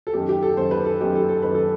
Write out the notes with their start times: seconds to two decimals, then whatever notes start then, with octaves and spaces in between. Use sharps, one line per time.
0.07 A4
0.13 F#2 D#3 G4
0.29 G4
0.43 A4
0.57 F#2 C5
0.60 D#3
0.71 B4
0.85 A4
1.00 F#2 D#3 G4
1.15 A4
1.29 A4
1.42 F#2 D#3 B4
1.55 A4